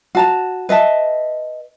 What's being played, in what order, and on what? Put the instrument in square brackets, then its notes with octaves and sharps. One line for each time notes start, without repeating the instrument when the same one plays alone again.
[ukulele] F#4 A5 A#5
B4 D#5 E5 A5